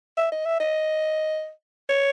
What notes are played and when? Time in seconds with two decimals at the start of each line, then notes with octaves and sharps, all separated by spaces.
0.17 E5
0.32 D#5
0.45 E5
0.60 D#5
1.89 C#5